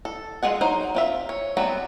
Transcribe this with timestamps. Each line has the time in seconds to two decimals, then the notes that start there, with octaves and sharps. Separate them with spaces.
0.05 A4
0.43 G#3 F4 G#4 F#5
0.61 F#3 D#4 C5
0.95 C4 F4 E5
1.29 C#5
1.57 F#3 G3 A3 B3 C4